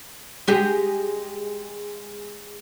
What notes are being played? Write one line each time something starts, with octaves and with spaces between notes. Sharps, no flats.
G#3 G4 G#4